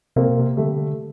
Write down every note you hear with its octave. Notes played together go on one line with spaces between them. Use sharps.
C3 A#3 C4
B2
C3
D3 G3 A3